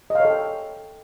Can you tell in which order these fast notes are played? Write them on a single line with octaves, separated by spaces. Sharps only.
D#5 F5 C#5 A4 G5